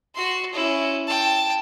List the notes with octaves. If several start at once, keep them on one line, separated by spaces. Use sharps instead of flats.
F#4 C6
C#4 E4
G5 A5